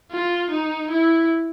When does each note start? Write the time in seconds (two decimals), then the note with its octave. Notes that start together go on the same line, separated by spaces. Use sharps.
0.12 F4
0.51 D#4
0.90 E4